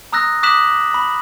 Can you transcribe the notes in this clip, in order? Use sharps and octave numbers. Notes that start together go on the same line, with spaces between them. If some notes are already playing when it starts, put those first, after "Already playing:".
A#5 D#6 E6 F#6 A#6
D6 D#6 F#6 B6 E7 F#7
B5